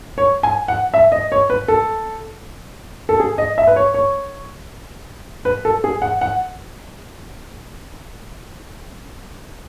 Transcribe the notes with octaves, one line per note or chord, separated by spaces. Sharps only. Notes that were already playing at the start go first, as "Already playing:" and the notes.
C#5
G#5
F#5
E5
D#5
C#5
B4
A4
A4
G#4
D#5
E5
B4
C#5
C#5
B4
A4
G#4
F#5
F#5